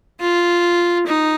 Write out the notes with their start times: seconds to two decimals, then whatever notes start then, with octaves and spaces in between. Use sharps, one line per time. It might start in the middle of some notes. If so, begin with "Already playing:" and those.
0.20 F4
1.07 D#4